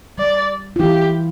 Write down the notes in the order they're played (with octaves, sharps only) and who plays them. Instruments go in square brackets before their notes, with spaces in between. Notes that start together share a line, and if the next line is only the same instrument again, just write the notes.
[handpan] G3 [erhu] D5
[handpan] F4
[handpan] E3 E4 [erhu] G4